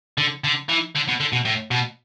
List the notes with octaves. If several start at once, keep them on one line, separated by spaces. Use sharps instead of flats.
D3
D3
E3
D3
B2
D3
B2
A2
B2